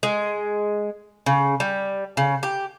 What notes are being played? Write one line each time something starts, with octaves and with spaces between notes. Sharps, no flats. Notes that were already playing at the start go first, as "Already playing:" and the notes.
G#3
C#3
G3
C#3
G4